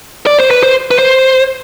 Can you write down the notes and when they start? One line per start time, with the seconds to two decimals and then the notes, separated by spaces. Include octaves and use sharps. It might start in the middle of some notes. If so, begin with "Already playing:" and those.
0.27 D5
0.39 C5
0.51 B4
0.63 C5
0.91 B4
0.99 C5